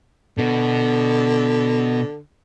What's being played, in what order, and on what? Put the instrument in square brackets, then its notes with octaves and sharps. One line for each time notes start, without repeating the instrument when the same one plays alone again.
[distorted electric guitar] B2 B3 [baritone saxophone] D3